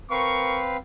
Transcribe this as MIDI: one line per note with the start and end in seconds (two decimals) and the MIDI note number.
0.11 0.77 60
0.11 0.63 70
0.11 0.77 71
0.11 0.77 77
0.11 0.63 85